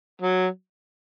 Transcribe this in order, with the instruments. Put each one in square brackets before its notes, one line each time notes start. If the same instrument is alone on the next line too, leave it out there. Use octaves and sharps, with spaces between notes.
[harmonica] F#3